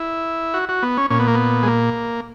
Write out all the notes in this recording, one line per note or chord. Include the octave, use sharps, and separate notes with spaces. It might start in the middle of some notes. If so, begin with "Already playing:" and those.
Already playing: E4
F#4
F#4
B3
C#4
A#2 C#4
B3
A#3
B3
G#3
A#3